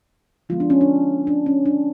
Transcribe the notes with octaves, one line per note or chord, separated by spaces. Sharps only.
D3 F3 G#3 B3 F4
D4
C#4
D4
D4
C#4
D4